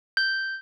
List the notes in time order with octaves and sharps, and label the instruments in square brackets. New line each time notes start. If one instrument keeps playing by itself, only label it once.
[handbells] G6